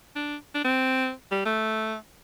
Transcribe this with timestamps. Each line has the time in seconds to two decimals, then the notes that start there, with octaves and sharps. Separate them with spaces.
0.16 D4
0.55 D4
0.64 C4
1.31 G3
1.45 A3